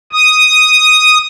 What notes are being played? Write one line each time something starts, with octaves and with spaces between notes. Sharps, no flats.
D#6